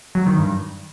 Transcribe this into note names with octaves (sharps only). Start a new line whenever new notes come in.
F#3
D#3
G2